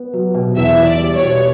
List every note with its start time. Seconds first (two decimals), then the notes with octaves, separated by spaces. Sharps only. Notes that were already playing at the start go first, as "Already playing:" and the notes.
Already playing: B3
0.13 F#3
0.34 B2
0.56 E2 E5
0.78 E2
0.85 D5
0.99 G3
1.14 C#5
1.21 B2